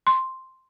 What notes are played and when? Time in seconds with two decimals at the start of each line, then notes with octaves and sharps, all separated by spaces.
0.07 C6